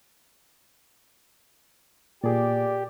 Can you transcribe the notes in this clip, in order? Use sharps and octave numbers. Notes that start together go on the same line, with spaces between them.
A#2 G4 G#4 D5